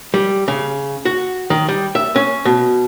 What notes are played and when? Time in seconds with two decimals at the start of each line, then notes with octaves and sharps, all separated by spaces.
0.14 G3
0.48 C#3
1.05 F#4
1.50 D#3
1.68 G3
1.95 E5
2.16 C#4
2.45 B2